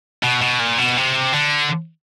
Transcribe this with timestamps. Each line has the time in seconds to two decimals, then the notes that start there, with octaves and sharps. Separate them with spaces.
0.23 B2
0.41 B2
0.60 A#2
0.78 B2
0.97 C3
1.33 D3